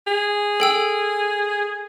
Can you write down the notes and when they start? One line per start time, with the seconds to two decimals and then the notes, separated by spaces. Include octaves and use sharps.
0.07 G#4
0.60 A4 G5 E6